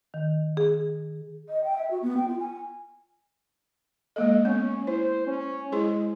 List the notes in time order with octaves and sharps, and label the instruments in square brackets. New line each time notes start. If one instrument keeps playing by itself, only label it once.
[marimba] D#3
G#4
[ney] D#5
G5
E5
F#4
B3
G5
F4
G#5
[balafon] G#3 A#3 A4 [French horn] D#5
[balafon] B3 [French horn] C#4
[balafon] E4 [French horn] C5
[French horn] C#4
[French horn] G#3 [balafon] E4 G#4 C5